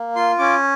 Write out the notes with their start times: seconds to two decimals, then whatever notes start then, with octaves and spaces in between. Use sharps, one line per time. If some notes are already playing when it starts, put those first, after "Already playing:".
Already playing: A#3
0.16 F4 C6
0.39 C#4 D6